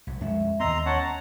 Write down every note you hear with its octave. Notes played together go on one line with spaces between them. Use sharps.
B1
F2 G#3 C#4 E5
D#2 B3 D#5 A#5 C6 E6
C#4 C#5 F#5 A5
A#5